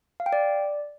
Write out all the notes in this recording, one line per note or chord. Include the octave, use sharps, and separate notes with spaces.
F5
G5
D5